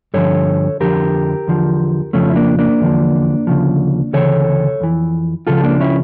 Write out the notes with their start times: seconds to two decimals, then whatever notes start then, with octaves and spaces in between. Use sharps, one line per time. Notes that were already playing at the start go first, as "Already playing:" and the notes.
0.14 G2 D3 F3 A4 C#5
0.80 F2 D3 F3 G4 A#4
1.48 E2 D3 F3
2.13 F2 C#3 F3 A3 C#4
2.29 E4
2.36 A#3 D4
2.59 A#3 D4
2.80 E2 D3 F3
3.47 D2 C#3 F3
4.13 D2 C#3 E3 A4 C#5
4.81 F2 E3
5.47 C#2 C#3 F3 F4 A4
5.64 A#3 D4
5.81 C#4 E4